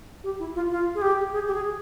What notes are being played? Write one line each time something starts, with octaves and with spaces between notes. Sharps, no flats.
G4
E4
F4
F4
G#4
G4
G#4
G4
G#4